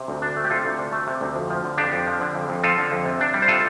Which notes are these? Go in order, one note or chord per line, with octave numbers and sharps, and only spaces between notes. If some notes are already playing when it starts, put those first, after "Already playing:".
Already playing: C3
D2
D4
A3
G4
C3 F4 A4
D2
D4
A3
C3
D2
F2
F3
D3
F2 D4 G4
F2
F3
D3
F2
F2
F3 F4 A4
D3
F2
C3
D4
G3
C5
C3 F4 A4